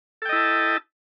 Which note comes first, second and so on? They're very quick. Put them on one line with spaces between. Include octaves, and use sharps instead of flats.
A4 G5 D#5 E4 A5